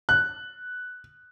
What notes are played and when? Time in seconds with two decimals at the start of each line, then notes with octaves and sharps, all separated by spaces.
0.09 F#6